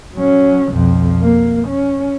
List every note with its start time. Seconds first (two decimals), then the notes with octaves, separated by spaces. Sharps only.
0.16 F#3 C#4
0.73 B1 F2
1.22 A#3
1.68 C#4